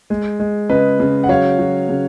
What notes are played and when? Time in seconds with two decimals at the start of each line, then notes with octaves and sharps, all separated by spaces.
0.10 G#3
0.40 G#3
0.70 C#3 B4 D#5
1.00 C#3
1.24 F#5
1.29 F#3 C#5 F5
1.59 F#3
1.89 C#3